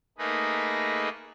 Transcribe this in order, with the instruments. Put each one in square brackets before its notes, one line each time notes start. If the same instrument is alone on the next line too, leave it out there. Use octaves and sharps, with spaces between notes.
[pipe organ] A3 A#3 D#4 G#4 B4 D#5